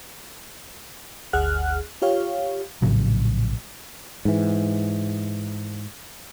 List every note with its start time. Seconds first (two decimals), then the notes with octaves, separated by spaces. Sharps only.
1.33 G1 D2 G#4 F#5 F6 F#6
2.02 F4 G4 C#5 F5
2.82 A#1 A2 C#3 F#3
4.25 G#2 E3